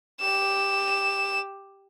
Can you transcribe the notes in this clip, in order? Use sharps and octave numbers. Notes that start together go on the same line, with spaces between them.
G4 E7